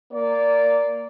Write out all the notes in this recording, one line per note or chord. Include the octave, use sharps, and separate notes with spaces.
A#3 D5